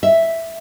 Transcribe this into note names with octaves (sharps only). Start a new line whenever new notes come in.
E5